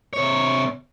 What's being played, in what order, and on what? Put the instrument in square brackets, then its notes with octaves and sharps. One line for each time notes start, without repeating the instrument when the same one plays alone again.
[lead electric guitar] C3 C#5